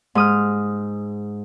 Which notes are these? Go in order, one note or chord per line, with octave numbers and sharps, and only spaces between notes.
G#2 D#6 F6